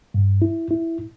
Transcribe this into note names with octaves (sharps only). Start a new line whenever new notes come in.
G2
E4
E4